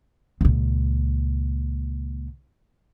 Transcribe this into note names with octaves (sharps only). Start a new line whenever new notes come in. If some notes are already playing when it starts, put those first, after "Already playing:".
C#2 A#2